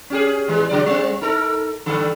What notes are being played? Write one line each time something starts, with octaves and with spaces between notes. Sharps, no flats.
C#4 G4 G#4
A2 E3 G#3
C#3 F#3 D5
G3 C4
D#4 A4 A#4
G2 D3 A4